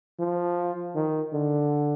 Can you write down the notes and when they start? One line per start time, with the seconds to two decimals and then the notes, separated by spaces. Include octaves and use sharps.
0.20 F3
0.95 D#3
1.33 D3